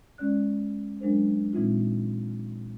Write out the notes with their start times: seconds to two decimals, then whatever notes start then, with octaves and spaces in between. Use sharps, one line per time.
0.18 G#3 C#4 D5 F#6
1.00 F#3 G#3 D4 A#4 C5
1.53 A#2 E3 G#3 C4 D#4 F4